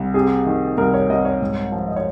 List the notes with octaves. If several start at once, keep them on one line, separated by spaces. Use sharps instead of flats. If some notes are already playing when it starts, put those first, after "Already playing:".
Already playing: C2
C3 G#4
D#3
C2 A#4
C#5
C2 D#5
C#5
G#2
F3
D#5
C#5